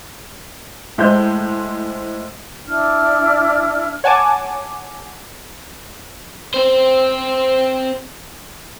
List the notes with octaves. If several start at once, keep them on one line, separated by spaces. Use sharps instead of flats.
A2 G#3 C5 G6
D4 E4 F6
C#5 F#5 G#5 A5 D6
C4 C5